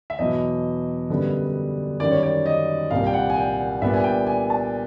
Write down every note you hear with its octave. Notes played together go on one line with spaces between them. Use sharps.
E5
E2 B2 F#3 D#5
F#2 D3 G3 B3
F#2 D#3 G3 D5
C#5
D5
D#5
C2 A#2 G3 A#3 F5
G5
F#5
G#5
G5
F#5
A#2 G3 B3 D4 E5
G#5
G5
G#5
A5